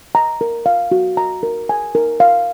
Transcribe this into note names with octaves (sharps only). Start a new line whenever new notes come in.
A#5
A#4
F5
F#4
A#5
A#4
G#5
A#4
F5